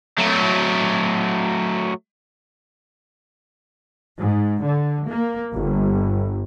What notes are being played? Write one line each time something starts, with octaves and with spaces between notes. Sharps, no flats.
F#3 A3
G#2
D3
A#3
G1